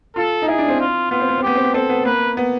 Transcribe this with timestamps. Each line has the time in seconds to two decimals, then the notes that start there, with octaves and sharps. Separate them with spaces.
0.16 F4 A4
0.42 D#4
0.48 E4 G#4
0.58 D4
0.68 C4
0.80 F4
1.11 B3 F4
1.20 C4
1.29 B3
1.38 C4
1.43 B3 G4
1.55 C4
1.64 B3
1.74 C4 A4
1.89 B3
2.05 A#3 B4
2.37 B3